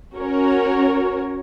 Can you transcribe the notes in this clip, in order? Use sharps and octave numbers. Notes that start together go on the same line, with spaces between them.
C#4 F#4 A#4 C#5